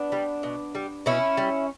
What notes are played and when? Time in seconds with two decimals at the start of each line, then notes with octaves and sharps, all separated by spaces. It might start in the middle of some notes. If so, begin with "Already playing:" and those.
Already playing: B3 D4
0.12 G3
0.43 B2
0.75 G3
1.06 B2 C#4 E4
1.37 G3